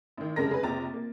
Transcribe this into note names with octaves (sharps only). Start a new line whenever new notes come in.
A1 D#3
F1 F#2 C#3 G#3 A#4 A#6
G#4 B4
F1 A#1 G5 A#5 A6
A#3